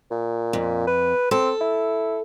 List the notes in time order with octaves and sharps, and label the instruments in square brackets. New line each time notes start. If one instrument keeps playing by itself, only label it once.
[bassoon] A#2
[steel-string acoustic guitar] F2
[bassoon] B4
[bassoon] C4 [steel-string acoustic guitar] A4
[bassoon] E4